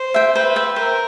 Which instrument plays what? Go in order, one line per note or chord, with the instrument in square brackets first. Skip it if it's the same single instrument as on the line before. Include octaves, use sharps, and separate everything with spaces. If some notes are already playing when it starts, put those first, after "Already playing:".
Already playing: [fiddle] C5
[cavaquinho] E5 G5
[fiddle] B4 [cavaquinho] C5
[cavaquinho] E5 G5
[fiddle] A#4 [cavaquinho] C5